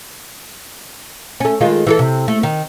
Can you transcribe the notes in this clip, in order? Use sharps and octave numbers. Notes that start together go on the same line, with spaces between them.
A3 C#4
D#3 G#3 F4
E3 F#4 A4
C3
A3
D#3